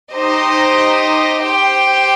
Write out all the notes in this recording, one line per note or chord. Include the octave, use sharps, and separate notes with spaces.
D#4 G4 C5 D#5
G4 C5 G5